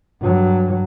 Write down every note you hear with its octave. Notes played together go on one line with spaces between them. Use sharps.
G2 F#3